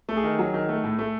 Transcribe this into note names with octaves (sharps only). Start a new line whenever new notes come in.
A3
G#4
D#3
F#3
D#3
A3
A2
A3